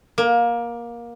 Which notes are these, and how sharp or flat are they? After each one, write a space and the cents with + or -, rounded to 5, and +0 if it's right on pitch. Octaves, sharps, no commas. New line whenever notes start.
A#3 +20